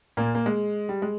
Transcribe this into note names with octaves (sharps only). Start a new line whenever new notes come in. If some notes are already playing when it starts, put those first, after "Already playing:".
A#2 A#3
A#3
G#3
G3
G#3